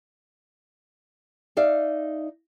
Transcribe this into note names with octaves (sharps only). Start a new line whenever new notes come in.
D#4 D5 E5 F5